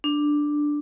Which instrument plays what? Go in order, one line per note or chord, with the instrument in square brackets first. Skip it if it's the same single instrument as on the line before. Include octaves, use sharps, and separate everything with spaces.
[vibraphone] D4